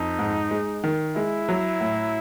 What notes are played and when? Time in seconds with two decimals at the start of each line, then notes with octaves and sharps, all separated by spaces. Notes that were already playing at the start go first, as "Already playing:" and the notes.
Already playing: F2 D#4
0.19 G#2
0.51 G#3
0.84 D#3
1.16 G#3 E4
1.49 F#3
1.81 A2